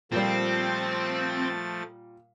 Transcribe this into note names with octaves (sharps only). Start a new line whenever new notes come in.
A#2 F3 G3 A3 C4 A6